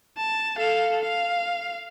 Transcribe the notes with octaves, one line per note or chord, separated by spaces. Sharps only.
A5
A4 F5
F5